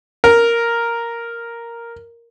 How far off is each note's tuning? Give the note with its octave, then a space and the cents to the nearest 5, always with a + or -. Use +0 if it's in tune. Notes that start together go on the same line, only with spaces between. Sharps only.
A#4 +0